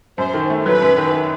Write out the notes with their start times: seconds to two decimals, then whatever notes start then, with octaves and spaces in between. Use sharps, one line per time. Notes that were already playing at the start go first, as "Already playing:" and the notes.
0.18 F#2 C5
0.34 D#3
0.50 A3
0.66 F#3 B4
0.82 F#2
0.98 D#3